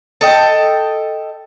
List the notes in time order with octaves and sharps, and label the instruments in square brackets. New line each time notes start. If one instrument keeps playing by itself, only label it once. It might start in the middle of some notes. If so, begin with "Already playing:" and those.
[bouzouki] A4 D#5 G5